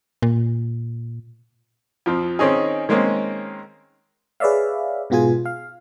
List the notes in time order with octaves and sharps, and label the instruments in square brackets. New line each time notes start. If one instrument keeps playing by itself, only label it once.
[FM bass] A#2
[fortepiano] F2 F3 C4
D#3 C4 C#4 D#4 G#4
D#3 G#3 A#3 C4 C#4
[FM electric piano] G#4 B4 C#5 D5 E5 F5
G#2 B2 B3 F4 G#4 G#5
F5